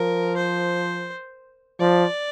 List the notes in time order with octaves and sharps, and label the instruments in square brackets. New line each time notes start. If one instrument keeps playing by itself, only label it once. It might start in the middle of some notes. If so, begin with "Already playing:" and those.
Already playing: [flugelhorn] F3 [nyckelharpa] A#4
[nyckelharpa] C5
[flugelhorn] F3 [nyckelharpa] D5